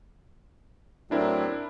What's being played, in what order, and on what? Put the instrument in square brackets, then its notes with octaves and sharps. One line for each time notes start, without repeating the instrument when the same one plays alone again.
[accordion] A2 F#3 C4 [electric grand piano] D4 E4 A#4